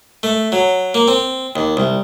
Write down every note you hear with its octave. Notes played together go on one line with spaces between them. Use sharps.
A3
F#3
A#3
C4
D#2
C2